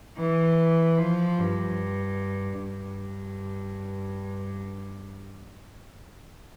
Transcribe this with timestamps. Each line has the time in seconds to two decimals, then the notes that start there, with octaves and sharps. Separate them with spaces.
0.17 E3
0.98 F3
1.39 G2
2.61 G2